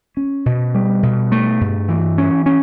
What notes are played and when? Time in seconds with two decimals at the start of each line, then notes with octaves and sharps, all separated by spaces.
0.17 C#4
0.46 B2
0.74 G3
1.03 B2
1.32 A3
1.61 G2
1.89 E3
2.18 C#4
2.46 C#4